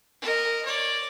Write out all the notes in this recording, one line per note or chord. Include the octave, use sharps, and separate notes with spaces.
A#4 D#5
C#5 D5